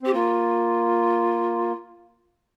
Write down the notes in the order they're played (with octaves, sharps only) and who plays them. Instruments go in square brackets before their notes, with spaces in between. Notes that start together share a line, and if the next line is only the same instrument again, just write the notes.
[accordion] C4 [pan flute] G4
[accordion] A#3 [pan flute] F4